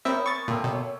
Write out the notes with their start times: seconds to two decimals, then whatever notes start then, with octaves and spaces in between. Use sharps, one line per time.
0.05 B3 C4 A#4 C#5 E5
0.26 G#5 C#6 A6
0.48 A#2 A3 A#3 C4
0.64 B2 C#5